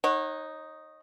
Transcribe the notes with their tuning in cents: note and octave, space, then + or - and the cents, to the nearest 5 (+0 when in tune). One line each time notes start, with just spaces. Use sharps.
D#4 +0 C#5 -35 F#5 +0